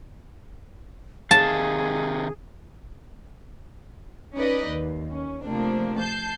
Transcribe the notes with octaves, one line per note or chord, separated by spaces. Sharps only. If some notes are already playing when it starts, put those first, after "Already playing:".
C3 D#3 G#4 F5 A5
C#4 D#4 B4 D5 D#5
D#2
C#4
C3 F3 A3 A#3 C4 D4
A5 G6 C7